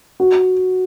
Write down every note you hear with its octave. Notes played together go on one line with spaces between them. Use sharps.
F#4